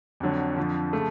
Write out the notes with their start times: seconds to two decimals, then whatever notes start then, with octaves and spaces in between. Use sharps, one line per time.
0.20 F2 D3 F#3
0.56 F2 D3 F3
0.93 C#3 F3 A3